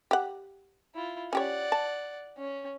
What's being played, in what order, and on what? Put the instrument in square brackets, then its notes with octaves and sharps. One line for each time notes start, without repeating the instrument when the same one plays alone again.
[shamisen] G4 F#5
[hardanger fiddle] E4 F4
[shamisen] C#4 G4 C#5 [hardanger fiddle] D5 F#5
[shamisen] A5
[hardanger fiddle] C#4